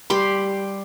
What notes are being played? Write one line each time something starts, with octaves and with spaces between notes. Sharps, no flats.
G3 G4 B5 C6